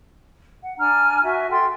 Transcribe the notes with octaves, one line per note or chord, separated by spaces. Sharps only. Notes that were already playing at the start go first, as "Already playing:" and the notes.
F#5
D4 G#5 A#5 F6
F#4 E5 G#5
A4 G5 C6